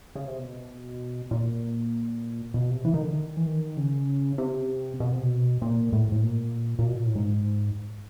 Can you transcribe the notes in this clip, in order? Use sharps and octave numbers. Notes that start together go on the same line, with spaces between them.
C#3
C3
B2
A#2
B2
C3
E3
D#3
D3
D#3
E3
D#3
C#3
C3
B2
C3
B2
A#2
A2
A2
A#2
A#2
B2
A#2
A2
G#2